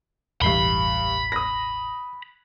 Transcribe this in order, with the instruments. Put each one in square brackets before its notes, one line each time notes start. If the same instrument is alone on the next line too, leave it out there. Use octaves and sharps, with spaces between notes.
[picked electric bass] E1 A1 E3 [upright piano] G2 C7 G7 [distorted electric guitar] B5
[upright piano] D#6 A#6